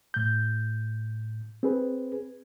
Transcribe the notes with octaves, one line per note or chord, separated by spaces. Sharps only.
A2 G6
C4 G#4 B4